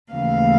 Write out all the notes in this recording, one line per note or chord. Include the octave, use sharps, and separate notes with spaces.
D#2 C#3 E3 A3 F5